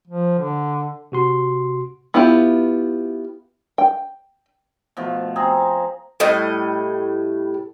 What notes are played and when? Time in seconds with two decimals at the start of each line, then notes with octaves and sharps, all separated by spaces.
0.07 F3
0.39 D3
1.12 C3 F#4 C6
2.14 B3 E4 F4 G4
3.78 G5
4.97 B2 F3 A3
5.36 C4 G#4 A#5
6.20 A2 G3 D#5